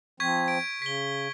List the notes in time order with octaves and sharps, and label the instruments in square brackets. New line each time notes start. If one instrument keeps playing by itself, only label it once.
[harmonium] F3 C4 [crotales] C#6 G#6 B6
[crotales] D7
[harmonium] C#3 [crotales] B6 G7